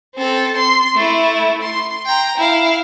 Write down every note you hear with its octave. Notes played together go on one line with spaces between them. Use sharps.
C4 A4
C6
A3 E4
C6
G5 A#5
E4 F5